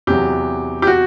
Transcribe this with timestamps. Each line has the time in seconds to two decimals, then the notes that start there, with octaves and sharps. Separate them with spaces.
0.07 E2 C3 F#3 G4
0.82 G4
0.87 F#4